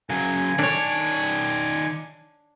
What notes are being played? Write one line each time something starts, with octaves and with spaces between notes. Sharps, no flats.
C#3 F#3 G#5
D#3 D4 C#5 D5